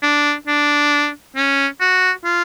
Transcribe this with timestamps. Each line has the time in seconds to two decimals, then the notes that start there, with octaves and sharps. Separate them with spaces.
0.02 D4
0.47 D4
1.36 C#4
1.80 F#4
2.24 F4